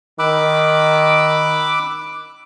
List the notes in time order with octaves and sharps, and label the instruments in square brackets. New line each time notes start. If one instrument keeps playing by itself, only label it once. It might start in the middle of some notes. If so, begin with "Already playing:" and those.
[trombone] D#3 [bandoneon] B5 E6 F#6 [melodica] D6